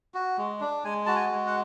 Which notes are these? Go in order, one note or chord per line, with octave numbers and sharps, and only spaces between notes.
F#4
G#3
D4
G#3 G#5
F#4 A5
G#5
G#3
F#5